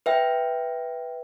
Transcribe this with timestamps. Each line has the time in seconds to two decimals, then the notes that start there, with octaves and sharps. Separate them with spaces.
0.06 B4 E5 G5